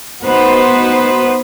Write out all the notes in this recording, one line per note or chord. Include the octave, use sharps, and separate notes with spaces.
B3 D#4 F#4 B4 C5